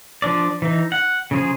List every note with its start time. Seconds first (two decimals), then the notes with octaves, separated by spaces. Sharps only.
0.22 F3 D4 D5
0.62 E3 D#4
0.92 F#5
1.31 C#3 F3 G#4